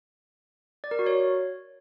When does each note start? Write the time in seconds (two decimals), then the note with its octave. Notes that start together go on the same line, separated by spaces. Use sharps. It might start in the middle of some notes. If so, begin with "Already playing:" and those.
0.84 D5
0.91 A#4
0.99 F#4
1.06 C#5